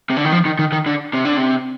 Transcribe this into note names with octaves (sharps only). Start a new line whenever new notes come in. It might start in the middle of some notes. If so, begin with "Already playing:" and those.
C3
D3
D#3
F3
D#3
D#3
D#3
D3
C3
D3
C3